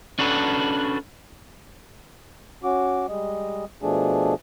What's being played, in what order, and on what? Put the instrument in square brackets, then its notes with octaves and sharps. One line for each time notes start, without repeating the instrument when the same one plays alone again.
[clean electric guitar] C#4 D4 F#4 A4 B4
[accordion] C#4 F#4 D6
G3 G#3 D#5
B2 F3 A3 D4 G#4